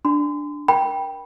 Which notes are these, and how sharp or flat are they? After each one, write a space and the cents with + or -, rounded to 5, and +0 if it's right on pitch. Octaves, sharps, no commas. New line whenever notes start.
D4 +0 C6 -35
A#4 +25 G5 +0 B5 -15